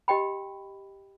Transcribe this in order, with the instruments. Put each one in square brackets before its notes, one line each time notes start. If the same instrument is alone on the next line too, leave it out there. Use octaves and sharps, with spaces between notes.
[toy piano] G4 D#5 G5 B5